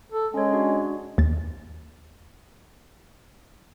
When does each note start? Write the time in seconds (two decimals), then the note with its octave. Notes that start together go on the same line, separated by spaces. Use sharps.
0.12 A4
0.34 G#3 C#4 C#5
0.53 D4 F#4
1.18 D#2 A6